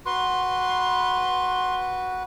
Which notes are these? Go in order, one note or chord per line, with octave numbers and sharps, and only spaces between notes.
F#4 B4 C6